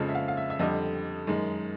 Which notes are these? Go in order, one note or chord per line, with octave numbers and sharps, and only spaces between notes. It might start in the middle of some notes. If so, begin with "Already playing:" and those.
Already playing: F2 C#3 F3 G#3
E5
F5
F5
E5
E5
F2 D3 G3 D#5
F#2 D#3 G#3